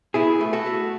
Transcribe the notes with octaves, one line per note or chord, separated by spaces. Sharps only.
B2 E4 G#4
A3
F#4 A4
A3